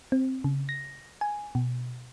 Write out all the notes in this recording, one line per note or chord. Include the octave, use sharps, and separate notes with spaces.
C4
C#3
A#6
G#5
B2